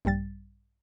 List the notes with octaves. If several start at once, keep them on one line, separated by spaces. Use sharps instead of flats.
A#1 G2 G3 A6